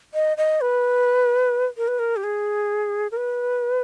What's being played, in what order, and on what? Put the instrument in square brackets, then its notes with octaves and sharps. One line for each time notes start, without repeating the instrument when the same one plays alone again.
[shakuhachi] D#5
D#5
B4
A#4
B4
A#4
G4
G#4
A#4
B4